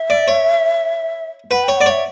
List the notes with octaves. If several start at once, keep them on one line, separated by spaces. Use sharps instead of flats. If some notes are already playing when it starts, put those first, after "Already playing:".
Already playing: E5
D5
C#5
B4 F#5
C#5 G5
D5 F#5
C#5 E5